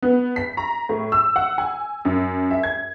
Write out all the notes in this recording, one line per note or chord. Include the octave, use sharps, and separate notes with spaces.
B3
B6
A#5
A2
E6
F#5
G#5
F#2
E5
G#6